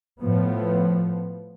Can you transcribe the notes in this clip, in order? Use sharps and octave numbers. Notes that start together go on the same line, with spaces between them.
A2 F3 B3